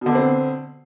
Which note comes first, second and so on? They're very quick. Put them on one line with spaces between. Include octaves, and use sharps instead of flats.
B2 D3 B3 C4